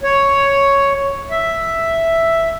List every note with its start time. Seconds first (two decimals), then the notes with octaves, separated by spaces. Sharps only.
0.03 C#5
1.31 E5